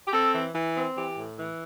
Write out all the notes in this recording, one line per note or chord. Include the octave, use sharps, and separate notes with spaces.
G4
C4 A4
E3
E3
C4
E3 G4
A2
E3